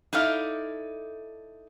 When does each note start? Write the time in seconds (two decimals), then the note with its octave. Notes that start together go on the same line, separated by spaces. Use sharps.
0.13 D#4 E4 A4 D5 F5